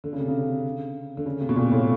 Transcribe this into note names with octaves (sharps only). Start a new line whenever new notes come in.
D3
C#3
C3
C#3
D3
C#3
C3
B2
A#2
A2